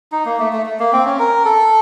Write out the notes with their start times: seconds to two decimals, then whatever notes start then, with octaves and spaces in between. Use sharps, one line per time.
0.12 D#4
0.26 A#3
0.39 A3
0.53 A3
0.66 A3
0.80 A#3
0.93 C4
1.05 C#4
1.19 A#4
1.45 A4